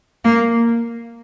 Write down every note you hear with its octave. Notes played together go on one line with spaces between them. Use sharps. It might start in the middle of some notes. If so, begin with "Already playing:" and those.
A#3